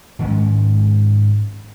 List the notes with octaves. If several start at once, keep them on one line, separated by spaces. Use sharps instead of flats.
G#2 D#3 G#3 C#4